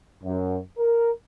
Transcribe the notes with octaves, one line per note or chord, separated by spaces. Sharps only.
F#2
A#4